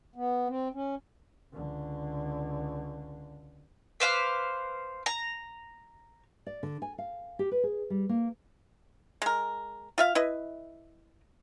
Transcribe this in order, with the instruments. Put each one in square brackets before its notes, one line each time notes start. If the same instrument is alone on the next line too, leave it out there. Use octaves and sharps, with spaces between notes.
[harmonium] B3
C4
C#4
[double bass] C#2 D3
[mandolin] B4 C5 F5 D6
A#5
[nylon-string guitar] D5
D3
G#5
F5
G4
B4
G#4
G3
A#3
[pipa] G#3 A#4
F4 E5 F5
E4 B4 D#5